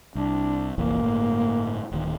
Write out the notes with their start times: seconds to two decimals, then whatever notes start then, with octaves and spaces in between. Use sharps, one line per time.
0.15 C2 D4
0.78 F1 A#1 E3 A#3
1.02 G1 A2
1.92 D1 D#3